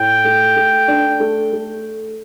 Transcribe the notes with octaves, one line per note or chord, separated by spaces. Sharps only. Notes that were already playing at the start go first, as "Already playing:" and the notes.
Already playing: A2 G5
A3
A3
D4
A3
A3